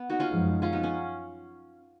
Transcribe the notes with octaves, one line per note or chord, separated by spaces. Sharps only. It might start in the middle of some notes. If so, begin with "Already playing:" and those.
Already playing: B3
D#4 F#4
C#4 F4
F#2 F3 G#3
C#4 F4
B3 D#4
C#4